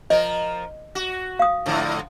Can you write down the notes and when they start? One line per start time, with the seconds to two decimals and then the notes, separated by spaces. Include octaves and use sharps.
0.10 F3 A#4 D#5
0.95 F#4
1.39 F5 D#6
1.66 G#2 D3 F3